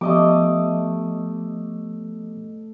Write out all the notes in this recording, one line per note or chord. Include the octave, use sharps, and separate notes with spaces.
F3 A3 B3 G4 D#5 D6